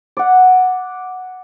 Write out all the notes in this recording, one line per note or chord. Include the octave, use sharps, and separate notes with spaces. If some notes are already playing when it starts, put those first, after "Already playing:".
D5 F#5